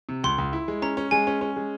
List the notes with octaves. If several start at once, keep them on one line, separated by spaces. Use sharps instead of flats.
C3
C#2 C6
C#2
E4
G#3
C#4 A#5
C#4
G#3 G#5
C#4
C#4
G#3